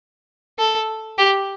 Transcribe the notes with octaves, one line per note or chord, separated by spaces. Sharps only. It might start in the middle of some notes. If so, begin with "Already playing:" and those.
A4
G4